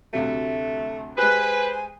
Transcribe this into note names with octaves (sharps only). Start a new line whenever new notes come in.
D2 C3 F#3 A3
G#3 G4 B4 C5 G#5